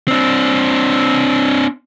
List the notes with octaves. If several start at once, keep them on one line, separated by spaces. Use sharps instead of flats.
C4 D4